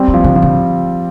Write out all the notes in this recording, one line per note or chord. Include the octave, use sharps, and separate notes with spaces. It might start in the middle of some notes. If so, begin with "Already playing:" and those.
Already playing: G3 C4
A#3
F3
D3
F3
D3